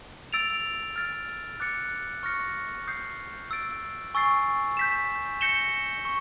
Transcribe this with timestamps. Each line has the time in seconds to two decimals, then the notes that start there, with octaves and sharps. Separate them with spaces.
0.33 E6 A6 D7 F7
0.96 F6 A6 D7
1.60 D6 F#6 A6 C#7
2.23 C#6 F6 A#6 C#7
2.88 D#6 G6 C7
3.51 E6 A6 D7
4.14 G#5 C#6 E6 A6 C7
4.77 G6 B6 E7
5.41 G6 A#6 C#7 E7 G7
6.05 C#6